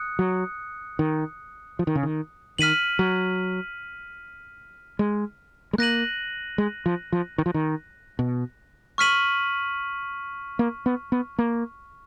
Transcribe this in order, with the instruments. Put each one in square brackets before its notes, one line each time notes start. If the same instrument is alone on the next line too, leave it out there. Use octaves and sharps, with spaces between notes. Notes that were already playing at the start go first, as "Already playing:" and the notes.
Already playing: [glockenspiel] D#6 F#6 C#7
[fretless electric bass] F#3
D#3
F3
D#3
C#3
D#3
[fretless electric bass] D#3 [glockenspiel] F6 B6 D#7 F#7
[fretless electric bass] F#3
G#3
G#3
[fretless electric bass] A#3 [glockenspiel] F#6 A#6 D#7 F#7
[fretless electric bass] G#3
F3
F3
D#3
F3
D#3
B2
[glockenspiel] C#6 F6 B6 D#7 F#7
[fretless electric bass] A#3
B3
B3
A#3